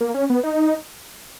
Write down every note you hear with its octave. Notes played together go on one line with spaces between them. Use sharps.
A#3
C#4
B3
D#4